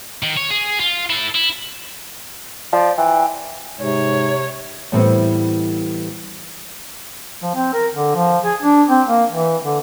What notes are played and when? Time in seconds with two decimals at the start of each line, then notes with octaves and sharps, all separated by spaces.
0.23 D#3
0.37 C#5
0.50 G#4
0.80 F4
1.10 E4 A4
1.35 E4
2.73 F3 D5
2.97 E3 G5
3.80 G#2 C3 C#5
4.92 A2 E3 G3 B3 C4
7.42 F3
7.55 C4
7.74 A#4
7.94 D3
8.15 F3
8.45 G#4
8.62 D4
8.88 C4
9.08 A#3
9.32 E3
9.64 D3